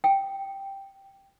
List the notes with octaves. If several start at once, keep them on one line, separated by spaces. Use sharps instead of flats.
G5